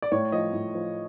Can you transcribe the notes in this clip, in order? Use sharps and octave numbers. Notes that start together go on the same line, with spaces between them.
D5
A2 C#5
F3 D#5
A2
F3